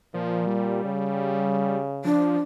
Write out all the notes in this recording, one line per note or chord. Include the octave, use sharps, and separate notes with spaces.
A#2 F3
G3
C#3
F3 D4